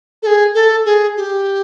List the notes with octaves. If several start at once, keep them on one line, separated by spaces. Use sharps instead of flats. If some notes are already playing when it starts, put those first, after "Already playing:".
A4
G#4
A4
G#4
G4